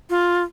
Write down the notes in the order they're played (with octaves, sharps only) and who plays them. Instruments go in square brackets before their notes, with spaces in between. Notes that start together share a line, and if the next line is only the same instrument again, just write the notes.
[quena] F4